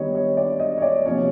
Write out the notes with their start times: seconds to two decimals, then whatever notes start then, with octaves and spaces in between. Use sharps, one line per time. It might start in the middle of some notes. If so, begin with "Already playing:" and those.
Already playing: D#3 G3 B3 C#5 D#5
0.15 C#5
0.37 D5
0.60 D#5
0.78 C#5
0.82 D5
1.05 C3 F3 A#3 C#4 C#5